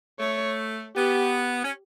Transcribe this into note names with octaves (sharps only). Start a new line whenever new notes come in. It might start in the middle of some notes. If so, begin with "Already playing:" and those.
A3 C#5
B3 G4
C#4